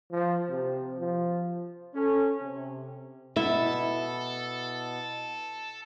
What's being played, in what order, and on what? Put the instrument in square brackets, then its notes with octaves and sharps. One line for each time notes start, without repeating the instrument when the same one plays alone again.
[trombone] F3
C3
F3
[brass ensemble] C#4 A4
C3
[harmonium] B2 B3 [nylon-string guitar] E4 [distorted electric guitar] A4 [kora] E5